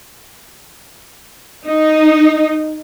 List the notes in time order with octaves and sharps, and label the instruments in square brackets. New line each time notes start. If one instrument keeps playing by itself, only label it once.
[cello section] D#4